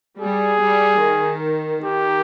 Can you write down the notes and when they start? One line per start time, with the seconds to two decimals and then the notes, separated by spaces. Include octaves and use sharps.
0.21 G3 G#4
0.62 G3
1.02 D#3
1.84 D#3 G4